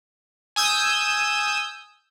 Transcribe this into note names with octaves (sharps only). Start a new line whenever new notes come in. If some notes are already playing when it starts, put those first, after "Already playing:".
G#5 D#6 E6 G6